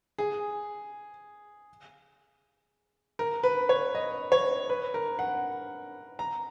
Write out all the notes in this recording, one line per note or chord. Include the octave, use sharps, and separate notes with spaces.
G#4
A#4
B4
C#5
D#5
C#5
B4
A#4
F#5
A#5